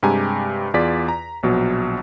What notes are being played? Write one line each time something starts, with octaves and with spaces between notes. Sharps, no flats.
G2 C3 G#3 G4 G#5 A#5
E2 F4 G#4 D5 B6
A#5
A#1 B2 F#3